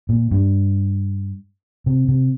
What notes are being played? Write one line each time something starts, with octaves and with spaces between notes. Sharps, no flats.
A#2
G2
C3
C3